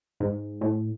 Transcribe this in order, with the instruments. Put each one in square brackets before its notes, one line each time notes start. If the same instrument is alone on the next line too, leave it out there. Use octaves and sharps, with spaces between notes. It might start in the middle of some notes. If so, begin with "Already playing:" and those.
[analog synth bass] G#2
A2